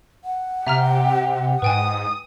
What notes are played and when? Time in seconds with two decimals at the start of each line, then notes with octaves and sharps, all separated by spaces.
0.24 F#5
0.67 C3 G4 E5 A#5 F6
1.62 G#2 B4 G5 G#5 D#6